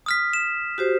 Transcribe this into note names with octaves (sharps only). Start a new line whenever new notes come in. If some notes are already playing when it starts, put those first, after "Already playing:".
D#6 F6 B6
E7
F#4 G4 C5